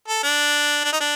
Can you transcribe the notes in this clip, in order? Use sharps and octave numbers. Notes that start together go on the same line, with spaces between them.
A4
D4
D4
D#4
D4